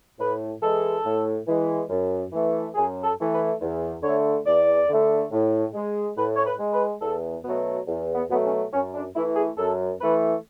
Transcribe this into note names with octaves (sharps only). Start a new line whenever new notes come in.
A2 B4
E3 G#3 A4
A2
E3 G#3
F#2
E3 A3
F#2 G#4
A4
E3 A3
B4
E2
D3 A3 C#5
E2 D5
D3 A3
A2
G#3
A2 B4
C#5
B4
G#3
B4
E2 A4
B2 F#3 A3 B3
E2
B3
B2 F#3 A3 B3
C#4
F#2 C#4
D4
E3 A3 E4
G#4
F#2 A4
E3 A3 B4